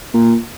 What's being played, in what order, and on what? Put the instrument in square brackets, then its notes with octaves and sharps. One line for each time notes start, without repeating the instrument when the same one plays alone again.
[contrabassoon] A#2